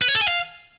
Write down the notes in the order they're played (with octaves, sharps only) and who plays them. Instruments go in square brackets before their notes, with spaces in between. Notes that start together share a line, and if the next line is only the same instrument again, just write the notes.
[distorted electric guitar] B4
C#5
A4
G#5
F5